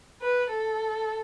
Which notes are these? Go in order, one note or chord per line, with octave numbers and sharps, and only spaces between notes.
B4
A4